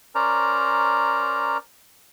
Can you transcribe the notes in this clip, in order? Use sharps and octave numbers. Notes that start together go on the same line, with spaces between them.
C#4 A#4 C5 D5 A#5